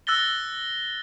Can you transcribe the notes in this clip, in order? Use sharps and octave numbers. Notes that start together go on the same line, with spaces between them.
E6 F#6 A6 A#6 G7